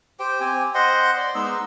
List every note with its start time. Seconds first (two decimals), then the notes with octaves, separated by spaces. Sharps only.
0.19 G4 C5 G5
0.41 C4 G4 G#5
0.75 C5 D#5 F#5 C6
1.17 D5
1.35 G#3 B3 D#4 E6